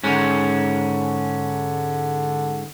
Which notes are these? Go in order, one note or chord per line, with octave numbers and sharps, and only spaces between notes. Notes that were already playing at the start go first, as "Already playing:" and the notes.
G#2 D3 C#4